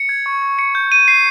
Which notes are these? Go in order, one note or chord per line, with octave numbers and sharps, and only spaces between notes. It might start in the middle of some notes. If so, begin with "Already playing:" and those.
Already playing: C#7
G#6
C#6
C#6
C#7
G6
D#7
C7